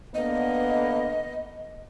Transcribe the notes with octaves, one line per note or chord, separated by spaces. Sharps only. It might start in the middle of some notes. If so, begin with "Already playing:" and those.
D3 A#3 B3 D#5